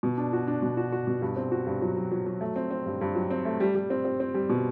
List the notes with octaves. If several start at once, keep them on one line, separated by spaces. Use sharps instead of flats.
B2
D4
F#4
D4
B2
F#4
F#4
B2
G2
C4
F#4
G2
F#3
F#3
F#3
F#3
A3
C4
C4
G2
G2
F#3
C4
A3
G3
G3
C4
C4
C4
G3
B2